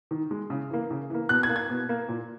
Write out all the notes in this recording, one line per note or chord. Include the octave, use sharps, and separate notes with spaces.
D#3
G#3
C#3
E3 A#3
C#3
E3 A#3
B2 F#6
G#6
A#3
G#6
B2
A#3
A#2